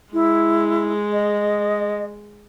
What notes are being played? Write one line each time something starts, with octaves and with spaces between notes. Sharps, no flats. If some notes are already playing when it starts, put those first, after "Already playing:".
G#3 E4
D#5